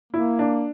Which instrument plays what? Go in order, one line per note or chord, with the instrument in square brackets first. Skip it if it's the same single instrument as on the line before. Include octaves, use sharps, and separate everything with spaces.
[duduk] A#3 [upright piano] E4
[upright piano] D4